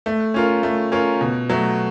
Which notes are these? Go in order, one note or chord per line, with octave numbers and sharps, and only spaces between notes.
A3
C#4 F4 A#4
A3
C#4 F4 A#4
B2
F#3 A3